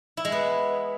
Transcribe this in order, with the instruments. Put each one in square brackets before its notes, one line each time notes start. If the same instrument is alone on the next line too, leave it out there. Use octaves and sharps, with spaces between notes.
[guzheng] E4
G#3
B3